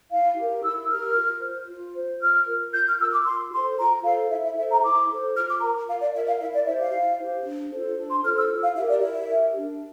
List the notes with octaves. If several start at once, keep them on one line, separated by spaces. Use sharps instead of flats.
E4 F5
G4 A#4
E4 E6
G4 A#4 F6
F4
C5
F4
C5
F4 F6
A#4
F4 G6
F6
A#4 E6
D6
F4 C6
A4 C5 C6
F4 A#5
A4 C5 F5
E4 E5
E5
A4 C5 E5
A#5
E4 D6
A4 C5
F4 F6
D6
A#4 A#5
F4 F5
D5
A#4 E5
F5
E4 E5
D5
G4 C5 E5
F5
E4
G4 C5
D4
F4 A4 C5
D4
C6
F4 A4 C5 F6
E6
E4
F5
G4 A#4 E5
D5
E4 E5
G4 A#4
D4